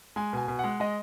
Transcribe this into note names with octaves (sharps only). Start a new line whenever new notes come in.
G#3 G#5
B2 G#5
B2
G#3 F#5
G#3 D#5